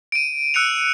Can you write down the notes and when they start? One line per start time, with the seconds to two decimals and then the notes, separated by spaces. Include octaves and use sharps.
0.12 D7 D#7
0.54 E6 F#6 C#7 D7 F7